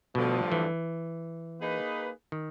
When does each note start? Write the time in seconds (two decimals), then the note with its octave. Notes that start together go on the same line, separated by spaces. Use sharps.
0.15 G2 B2 D3 F3 A3
0.52 E3
1.60 A#3 D#4 G#4 B4
2.32 D#3